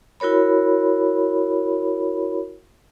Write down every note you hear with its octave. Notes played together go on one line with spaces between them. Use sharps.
E4 F#4 A#4 C#5 B5